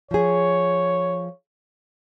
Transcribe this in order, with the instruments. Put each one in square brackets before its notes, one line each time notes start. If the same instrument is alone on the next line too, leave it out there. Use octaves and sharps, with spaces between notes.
[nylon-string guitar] F3 G#4 [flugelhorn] C#5